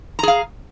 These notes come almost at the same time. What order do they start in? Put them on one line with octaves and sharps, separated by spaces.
A#5 G#4 F5